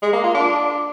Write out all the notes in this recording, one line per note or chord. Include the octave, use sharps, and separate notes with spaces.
G#3
A#3
F4
D4